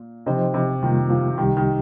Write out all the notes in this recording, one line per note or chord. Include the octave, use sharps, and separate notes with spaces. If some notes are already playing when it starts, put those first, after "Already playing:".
Already playing: A#2
C3 F3 D#4 C5 D#5
C3
F2 C3 D#3 G3 A#3 F4
F3
C2 C3 D#3 G3 D#4 G4
D#3